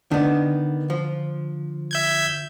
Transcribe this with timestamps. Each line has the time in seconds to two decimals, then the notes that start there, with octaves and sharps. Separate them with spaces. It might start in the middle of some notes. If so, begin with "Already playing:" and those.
0.11 D3 D#3 B3 D4
0.90 F3
1.91 E5 G6 G#6